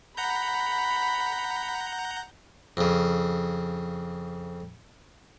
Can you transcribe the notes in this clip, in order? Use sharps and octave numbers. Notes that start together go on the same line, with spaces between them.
F#5 A#5 B5 G6
F2 C#3